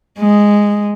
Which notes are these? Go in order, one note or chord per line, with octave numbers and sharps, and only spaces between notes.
G#3